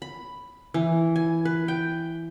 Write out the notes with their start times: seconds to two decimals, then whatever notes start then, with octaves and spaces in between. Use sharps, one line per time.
0.02 B5
0.74 E3
1.16 G#5
1.45 B4
1.68 G5